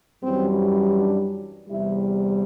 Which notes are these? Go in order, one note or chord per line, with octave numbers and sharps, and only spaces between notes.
F#2 E3 G3 C4
D4
E2 C3 G3 E4